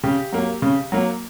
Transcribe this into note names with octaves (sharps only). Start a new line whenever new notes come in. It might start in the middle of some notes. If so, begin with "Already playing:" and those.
C#3 G4
F#3 A#3
C#3
F#3 A#3